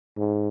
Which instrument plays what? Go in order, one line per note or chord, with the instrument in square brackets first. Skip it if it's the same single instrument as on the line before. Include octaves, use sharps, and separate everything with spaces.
[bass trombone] G#2